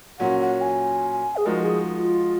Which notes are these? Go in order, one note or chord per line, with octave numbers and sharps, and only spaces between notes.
A#2 F#3 C#4 F#5
F#5
G#5
G#4
F3 G#3 D#4 F#4 A#4
G#4
F4